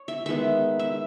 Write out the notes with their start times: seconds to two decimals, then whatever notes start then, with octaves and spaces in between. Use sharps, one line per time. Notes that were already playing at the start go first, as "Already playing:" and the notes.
Already playing: C#5
0.08 E5
0.26 D#3 G#3 B3 E5
0.79 E5